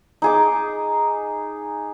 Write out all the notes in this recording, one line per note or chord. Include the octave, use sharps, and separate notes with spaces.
D#4 G#4 D6